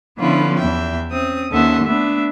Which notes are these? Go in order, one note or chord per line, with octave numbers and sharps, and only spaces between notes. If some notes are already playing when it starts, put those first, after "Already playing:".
D3 F3 B3 C#4 E4 F4
E2 E5 G5
C4 C#4 D#6
D#2 C#4 A4 E5 F#5 C6
A3 B3 D4 E5